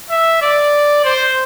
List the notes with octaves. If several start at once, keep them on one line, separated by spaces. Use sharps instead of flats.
E5
D5
C5